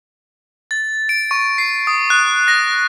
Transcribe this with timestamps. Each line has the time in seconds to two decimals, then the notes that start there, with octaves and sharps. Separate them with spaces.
0.71 A6
1.09 D7
1.31 C#6
1.58 C7
1.87 D#6
2.10 F#6
2.48 A#6